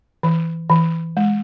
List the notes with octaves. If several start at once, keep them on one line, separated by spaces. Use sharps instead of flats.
E3
E3
G#3